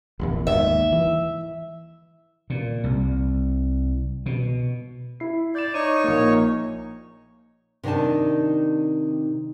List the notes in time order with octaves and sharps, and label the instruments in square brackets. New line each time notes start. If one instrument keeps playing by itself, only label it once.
[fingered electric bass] F1 A#1 E2
[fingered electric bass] D#2 G#2 [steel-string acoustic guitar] E5
[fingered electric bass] E3
[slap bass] A#2
C2
B2
[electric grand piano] E4 C7
[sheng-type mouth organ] D5 [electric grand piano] G6 E7
[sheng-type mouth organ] D#4 C#5 C#6 [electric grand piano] D6 D#7
[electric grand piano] A#1 A#3
[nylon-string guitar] C3 D#3 D4 D#4 A5